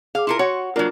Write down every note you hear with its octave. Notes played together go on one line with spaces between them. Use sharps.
G#4 F5 D6
E4 F4 A#4 C6 C#7
F#4 C#5
F#3 A#3 D4 F4 A#4